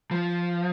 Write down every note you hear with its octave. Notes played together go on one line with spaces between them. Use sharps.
F3